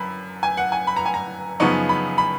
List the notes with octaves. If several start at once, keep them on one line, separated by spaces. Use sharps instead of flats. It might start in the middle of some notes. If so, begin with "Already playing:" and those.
Already playing: F#2 B5
G#5
F#5
G#5
B5
A#5
G#5
A#5
F#2 C#3 F3 B3 D#4 C#6
B5
B5